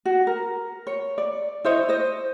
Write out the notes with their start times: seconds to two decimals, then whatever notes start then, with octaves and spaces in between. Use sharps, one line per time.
0.05 F#4
0.27 A#4
0.87 C#5
1.18 D5
1.64 E4 C5 C#5 D#5
1.89 C5 D#5